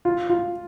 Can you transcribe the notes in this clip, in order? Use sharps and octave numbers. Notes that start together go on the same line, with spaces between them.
F4
F4